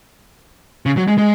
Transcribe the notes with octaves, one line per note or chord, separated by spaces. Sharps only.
C#3
F#3
G#3
G#3